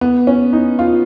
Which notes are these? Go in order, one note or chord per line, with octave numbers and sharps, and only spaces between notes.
B3
C#4
D#4
F4